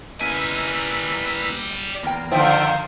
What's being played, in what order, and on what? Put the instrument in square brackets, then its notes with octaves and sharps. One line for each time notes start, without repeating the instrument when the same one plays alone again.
[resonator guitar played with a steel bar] C#3 [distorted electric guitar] G3 G#5 [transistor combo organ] A#3 E4 B4
[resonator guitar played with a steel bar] E2 G5 [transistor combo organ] A#3
[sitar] D3 D#3 F3 [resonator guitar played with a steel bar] C5 E5 G5 [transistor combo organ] D5 E6